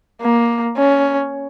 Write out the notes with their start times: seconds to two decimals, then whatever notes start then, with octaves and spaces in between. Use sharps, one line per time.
0.21 A#3
0.77 C#4